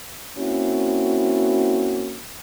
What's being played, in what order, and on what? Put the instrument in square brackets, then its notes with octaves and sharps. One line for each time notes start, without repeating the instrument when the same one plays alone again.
[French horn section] A#3 C4 C#4 E4 F#4